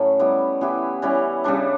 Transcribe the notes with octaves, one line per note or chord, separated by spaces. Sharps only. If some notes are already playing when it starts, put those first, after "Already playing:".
Already playing: A2 F#3 A3 C#4
G3 B3 E4
E3 B3 E4 G4
E3 G3 C#4 E4
C#3 G3 D4